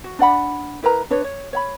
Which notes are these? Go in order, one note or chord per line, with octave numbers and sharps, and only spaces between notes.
F#4
D4 D5 F#5 B5
E4 A#4 B4 A#5
D4 B4 C#5
C#5
C#5 F#5 B5